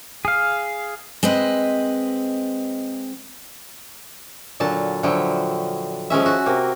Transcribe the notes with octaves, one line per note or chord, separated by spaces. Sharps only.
G#4 F5
G#3 C4 B4 D#5
A#2 D3 F#3 A5
D3 F3 F#3 E4 G5
F3 G#3 C#4 E5
F#4
C3 A#3